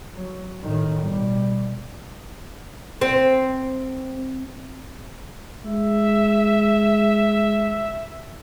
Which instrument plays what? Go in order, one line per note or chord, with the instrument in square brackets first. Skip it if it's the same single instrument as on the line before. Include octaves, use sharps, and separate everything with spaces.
[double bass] F#3
A2 D#3
B2 G3
[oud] C4
[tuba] G#3 [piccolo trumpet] E5